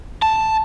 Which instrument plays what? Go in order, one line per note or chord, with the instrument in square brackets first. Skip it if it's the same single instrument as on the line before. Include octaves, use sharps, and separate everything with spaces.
[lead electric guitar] A5